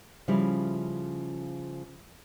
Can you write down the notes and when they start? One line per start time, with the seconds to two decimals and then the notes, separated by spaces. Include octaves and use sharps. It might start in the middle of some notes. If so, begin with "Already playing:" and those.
0.28 C#3 F3 G3 C#4 E4